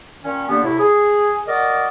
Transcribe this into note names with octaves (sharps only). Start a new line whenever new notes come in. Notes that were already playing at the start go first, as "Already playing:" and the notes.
A#2 D#3 C#4
D3 A#3 B3 D4 G4
A2 C3 E4
G#4
F#4 A#4 D5 D#5